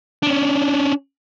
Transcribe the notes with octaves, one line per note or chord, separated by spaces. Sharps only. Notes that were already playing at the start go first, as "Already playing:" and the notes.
C#4 D4